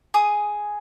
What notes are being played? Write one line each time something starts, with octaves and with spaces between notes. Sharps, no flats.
G#4 D#6